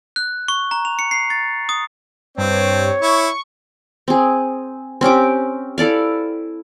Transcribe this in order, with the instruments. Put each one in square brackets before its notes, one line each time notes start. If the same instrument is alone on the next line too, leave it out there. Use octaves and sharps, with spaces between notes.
[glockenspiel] F#6
C#6
A#5
F7
C#7
C7
A6
D#6
[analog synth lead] G2 [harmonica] C4 [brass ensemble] C#5
[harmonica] E4 [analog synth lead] C#6
[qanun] C4 G#4
C4 C#4 G4 D6
E4 A4 D5 F5